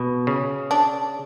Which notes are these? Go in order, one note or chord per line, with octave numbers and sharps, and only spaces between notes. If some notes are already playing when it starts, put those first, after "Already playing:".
Already playing: B2
C#3
D4